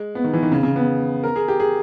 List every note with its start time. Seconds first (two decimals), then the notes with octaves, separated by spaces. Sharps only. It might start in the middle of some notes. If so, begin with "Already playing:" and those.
Already playing: G#3
0.15 B3
0.24 D#3
0.33 E3
0.43 D#3
0.52 C#3
0.63 C#3
0.76 B3
1.24 A#4
1.36 G#4
1.48 G4
1.60 G#4